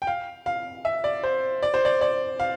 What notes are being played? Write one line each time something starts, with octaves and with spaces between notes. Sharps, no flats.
G5
F5
F5
E5
D5
C5
D5
C5
D5
D5
F5